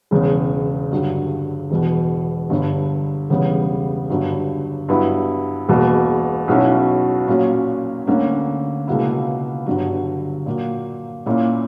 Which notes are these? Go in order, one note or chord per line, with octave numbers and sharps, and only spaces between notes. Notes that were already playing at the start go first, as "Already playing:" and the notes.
E1 E2 C#3
G2 D3 F#3
E1 E2 B2
G1 G2 D3
E1 E2 C#3 G3 B3
G1 G2 F#3
G2 F#3 B3 E4
E1 E2 B2 A#3
B1 B2 F#3 C#4 E4
A#2 F#3 C#4
D2 D3 A#3 C#4
C#2 B2 A#3 E4
G1 G2 D3 F#3
A#2 F#3 A#3
A#2 A#3 C#4 E4